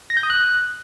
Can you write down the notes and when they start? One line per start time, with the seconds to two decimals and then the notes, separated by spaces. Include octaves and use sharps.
0.10 A#6
0.17 G6
0.23 D#6
0.30 F#6